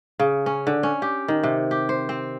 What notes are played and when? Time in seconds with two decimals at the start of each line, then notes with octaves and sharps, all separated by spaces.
0.19 C#3
0.46 C#4
0.67 D3
0.83 C#4
1.02 G4
1.28 D#3
1.43 C3
1.71 G4
1.89 C5
2.09 C4